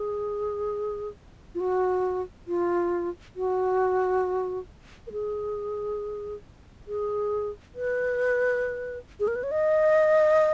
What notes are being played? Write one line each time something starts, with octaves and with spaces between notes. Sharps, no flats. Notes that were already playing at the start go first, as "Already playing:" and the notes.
Already playing: G#4
F4
F#4
F4
F#4
A#4
G#4
G#4
B4
G#4
A#4
B4
C#5
D#5